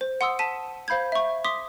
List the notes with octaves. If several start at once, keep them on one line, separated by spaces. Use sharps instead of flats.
C5
F#5 C6 D#6 E6
A5 B6 D#7
C5 F5 B5 G6 G#6
E5 C#6
C6 D6 D#6 B6